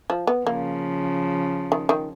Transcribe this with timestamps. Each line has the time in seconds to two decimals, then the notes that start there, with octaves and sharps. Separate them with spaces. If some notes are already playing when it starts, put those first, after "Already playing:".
0.10 F3
0.27 B3
0.46 C#3 F3 A#3
1.72 D#3
1.89 D#3